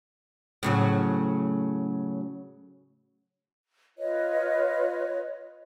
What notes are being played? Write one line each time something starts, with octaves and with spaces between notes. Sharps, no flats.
A2 C#3 F#3
F4 B4 C#5 D#5